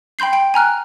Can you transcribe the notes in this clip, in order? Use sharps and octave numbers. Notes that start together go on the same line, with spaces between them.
G5 B5 C6 G6 C7
G5 D7
G#5 A#5 F6 F#6